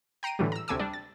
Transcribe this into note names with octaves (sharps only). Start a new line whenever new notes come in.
G5 A#5 C7 D7 D#7
A2 D3 E3 F#3 G3
A#5 E6
D2 C3 A3 G#5 D6 E6
G3 D4
A6